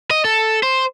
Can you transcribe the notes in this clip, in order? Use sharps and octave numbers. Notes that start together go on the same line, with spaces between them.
D#5
A4
C5